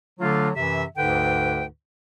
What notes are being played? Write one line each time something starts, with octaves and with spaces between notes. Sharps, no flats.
D3 F#3 A3 D4 F4
F#2 C3 E3 E5
D2 G#2 D3 B4 G5